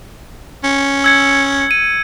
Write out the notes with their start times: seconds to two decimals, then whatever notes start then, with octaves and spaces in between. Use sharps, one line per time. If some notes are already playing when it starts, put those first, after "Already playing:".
0.64 C#4
1.04 E6 G#6 C#7
1.71 D#7